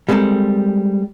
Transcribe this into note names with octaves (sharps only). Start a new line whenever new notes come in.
G3 G#3 B3 C4 A4 A#4